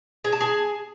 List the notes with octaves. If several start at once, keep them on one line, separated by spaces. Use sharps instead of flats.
G#4
A5
G#4